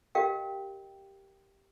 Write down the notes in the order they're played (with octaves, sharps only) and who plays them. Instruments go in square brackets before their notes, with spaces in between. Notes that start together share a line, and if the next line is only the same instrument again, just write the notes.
[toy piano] G4 A#4 D#5 F5 G5